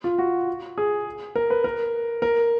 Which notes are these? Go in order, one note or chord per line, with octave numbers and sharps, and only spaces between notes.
F4
F#4
G#4
A#4
B4
A#4
A#4